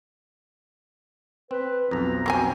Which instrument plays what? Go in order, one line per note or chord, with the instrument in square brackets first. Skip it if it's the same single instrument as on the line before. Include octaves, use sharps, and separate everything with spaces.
[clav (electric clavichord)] C4 [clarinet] B4
[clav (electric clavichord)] B1 F2 [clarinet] A#5
[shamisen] F#3 C4 G#5